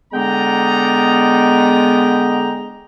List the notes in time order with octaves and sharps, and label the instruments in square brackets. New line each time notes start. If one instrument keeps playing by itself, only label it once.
[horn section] D3 G5 A#5 [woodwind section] G#3 B3